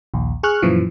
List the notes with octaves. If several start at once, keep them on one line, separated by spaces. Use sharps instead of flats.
A#1 D#2
G#4 C#6 F6 F#6
F#2 A#2 E3 F3